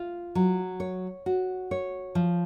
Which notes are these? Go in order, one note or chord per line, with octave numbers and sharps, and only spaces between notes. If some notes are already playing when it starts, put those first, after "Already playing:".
Already playing: F4
F#3
C#5
F#4
C#5
F3